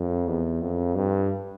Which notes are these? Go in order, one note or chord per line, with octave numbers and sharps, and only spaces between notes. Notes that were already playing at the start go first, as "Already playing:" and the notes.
Already playing: F2
E2
F2
G2